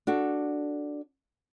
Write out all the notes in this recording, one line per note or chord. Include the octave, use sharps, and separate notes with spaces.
D4 F#4 A4